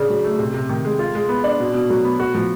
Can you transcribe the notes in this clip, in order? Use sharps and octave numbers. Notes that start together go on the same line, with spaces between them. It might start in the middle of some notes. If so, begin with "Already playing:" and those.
Already playing: C#3 D4
F#3
A3
C3
C3
D#3
G#3
F4
G#3
B3
D4
B2
B2
F#3
B3
F#4
F3